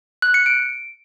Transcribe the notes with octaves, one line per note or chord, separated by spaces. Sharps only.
F#6
C#7
D7